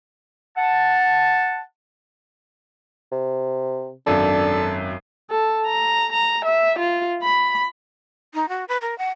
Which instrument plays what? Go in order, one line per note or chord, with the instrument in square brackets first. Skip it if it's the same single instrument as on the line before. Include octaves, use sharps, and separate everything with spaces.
[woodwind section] F#5 A5
[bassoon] C3
[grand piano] G#1 F#2 [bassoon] D4 [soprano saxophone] A4
[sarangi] A4
A#5
A#5
E5
F4
B5
[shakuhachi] D#4
F#4
B4
A#4
F#5